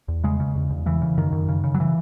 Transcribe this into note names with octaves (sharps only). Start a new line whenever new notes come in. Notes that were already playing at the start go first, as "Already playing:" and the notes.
E2
C#3 G#3
C#3
E2
E2
C#3 E3
C#3
F#2 D#3
F#2
C#3
C#3
F#3
E3